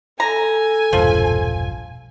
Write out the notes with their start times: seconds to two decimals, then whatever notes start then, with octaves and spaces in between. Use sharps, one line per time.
0.20 A4 G#5 A#5
0.93 E1 A#1 G2 F3